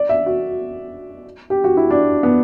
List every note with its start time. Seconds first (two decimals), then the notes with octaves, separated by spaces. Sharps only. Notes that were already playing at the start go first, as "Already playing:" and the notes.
Already playing: D5
0.09 E5
0.26 F#4
1.50 G4
1.64 F#4
1.77 E4
1.91 D4
2.23 B3